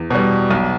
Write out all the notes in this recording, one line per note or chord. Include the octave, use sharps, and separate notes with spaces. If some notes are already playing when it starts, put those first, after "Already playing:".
Already playing: E2
B2 G3
B1